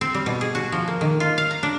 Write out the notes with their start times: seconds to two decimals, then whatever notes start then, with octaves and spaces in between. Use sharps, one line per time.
0.01 C4
0.14 G3
0.26 B2
0.41 G#4
0.55 F#4
0.72 F3
0.88 A#3
1.01 D#3
1.20 F4
1.38 F5
1.51 A#5
1.63 D4